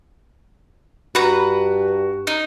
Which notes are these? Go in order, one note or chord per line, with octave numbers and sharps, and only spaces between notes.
G2 F#4 B4 A#5
D#4